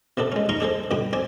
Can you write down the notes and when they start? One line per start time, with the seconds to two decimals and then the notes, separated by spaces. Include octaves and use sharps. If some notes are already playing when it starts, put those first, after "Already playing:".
0.17 C3 B3 D4 A4
0.32 G#3 C#4
0.49 D#4 F5 A#5 C6 C#6
0.60 D4 G#4 A4 C5
0.91 G2 B2 D3 G5 B5
1.13 C4 D5 G#5